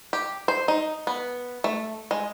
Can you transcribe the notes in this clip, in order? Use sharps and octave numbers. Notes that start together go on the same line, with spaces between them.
G4
C5
D#4
B3
A3
G#3